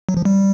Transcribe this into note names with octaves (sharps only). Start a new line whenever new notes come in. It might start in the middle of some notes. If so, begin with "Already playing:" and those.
F#3
F3
G3